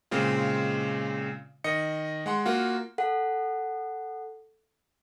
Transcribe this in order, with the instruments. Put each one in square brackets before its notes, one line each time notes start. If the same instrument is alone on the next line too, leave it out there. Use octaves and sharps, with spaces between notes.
[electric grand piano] A#2 C#3 G#3 C4 F4
D#3 D#5 C#7
G#3 F#5 C6
A#3 F4 F#4
[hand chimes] A4 F#5